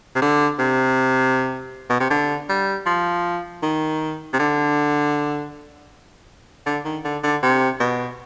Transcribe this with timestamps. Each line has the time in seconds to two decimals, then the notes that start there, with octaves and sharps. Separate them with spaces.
0.15 C3
0.21 D3
0.59 C3
1.90 B2
2.00 C3
2.10 D3
2.49 G3
2.86 F3
3.63 D#3
4.33 C3
4.39 D3
6.66 D3
6.84 D#3
7.04 D3
7.23 D3
7.43 C3
7.80 B2